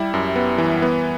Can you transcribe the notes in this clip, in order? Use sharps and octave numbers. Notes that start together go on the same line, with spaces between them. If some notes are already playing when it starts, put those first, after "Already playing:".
Already playing: G3 E4
F#2
B3
E3
B3